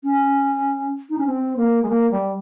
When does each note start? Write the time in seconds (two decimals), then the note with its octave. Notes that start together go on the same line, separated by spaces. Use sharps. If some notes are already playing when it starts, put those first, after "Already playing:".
0.04 C#4
1.10 D#4
1.18 C#4
1.26 C4
1.57 A#3
1.83 G#3
1.89 A#3
2.11 G3